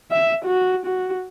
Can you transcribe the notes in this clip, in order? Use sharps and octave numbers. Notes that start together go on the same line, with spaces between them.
E5
F#4
F#4